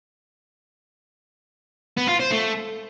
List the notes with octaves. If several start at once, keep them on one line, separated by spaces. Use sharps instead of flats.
B3
F4
C5
A3